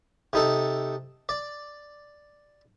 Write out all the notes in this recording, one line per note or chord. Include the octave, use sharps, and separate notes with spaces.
C3 D#4 A4
D5